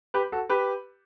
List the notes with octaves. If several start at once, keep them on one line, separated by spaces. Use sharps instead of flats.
G4 B4
F#4 A4
G4 B4